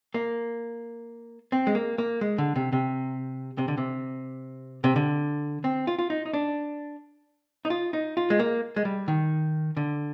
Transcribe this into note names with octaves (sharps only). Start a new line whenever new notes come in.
A#3
C4
G#3
A#3
A#3
G#3
D3
C3
C3
C3
D3
C3
C3
D3
C4
F4
F4
D#4
D#4
D4
D#4
F4
D#4
F4
G#3
A#3
G#3
G3
D#3
D3